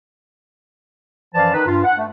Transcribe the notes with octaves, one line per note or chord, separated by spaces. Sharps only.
F#2 E3 F3 D5 F5 A5
D#3 D#4 B4
G2 F4
F#5
A3